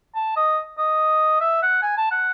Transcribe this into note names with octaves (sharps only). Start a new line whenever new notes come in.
A5
D#5
D#5
E5
F#5
G#5
A5
F#5